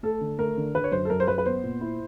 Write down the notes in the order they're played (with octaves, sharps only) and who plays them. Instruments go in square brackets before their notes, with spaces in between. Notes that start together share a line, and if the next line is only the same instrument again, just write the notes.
[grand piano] A3 [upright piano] A4
[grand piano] D3
[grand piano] A3 [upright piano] A#4
[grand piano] D3
[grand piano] D3 [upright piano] B4
[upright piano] C#5
[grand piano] F#2 [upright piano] C5
[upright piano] A4
[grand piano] F#2 [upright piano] A#4
[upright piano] C5
[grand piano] F#2 [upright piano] B4
[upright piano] B4
[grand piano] B3 [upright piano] C5
[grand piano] A#2
E4